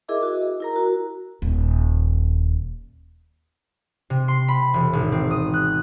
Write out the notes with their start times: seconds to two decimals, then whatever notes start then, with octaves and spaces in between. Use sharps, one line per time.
0.08 E4 G#4 A#4 D#5 E5 D6
0.23 F#4 D#5
0.42 G#4
0.60 E4 A#4 A#5
0.76 F#4 A#4
1.42 D#1
4.10 C3
4.28 C6
4.48 B5
4.74 E1
4.93 G#1
5.12 C4
5.31 D#6
5.54 F#6